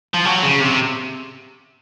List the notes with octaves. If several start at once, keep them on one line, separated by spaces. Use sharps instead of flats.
F3
F#3
C#3
C3